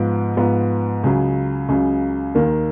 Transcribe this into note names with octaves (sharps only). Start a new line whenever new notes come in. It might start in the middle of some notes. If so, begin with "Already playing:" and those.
Already playing: G#2 F3 B3
G#2 F3 B3
C#2 C#3 F#3
C#2 C#3 F#3
D#2 D#3 A#3